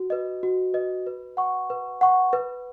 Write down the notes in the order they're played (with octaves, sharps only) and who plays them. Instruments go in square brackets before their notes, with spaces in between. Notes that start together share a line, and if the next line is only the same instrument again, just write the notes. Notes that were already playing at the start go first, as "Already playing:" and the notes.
Already playing: [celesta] F#4
B4 D#5
F#4
B4 D#5
B4
F#5 C#6
B4
F#5 C#6
B4